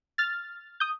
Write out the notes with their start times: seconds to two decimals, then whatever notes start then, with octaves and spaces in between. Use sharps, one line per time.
0.18 F6 A6
0.80 D#6 G6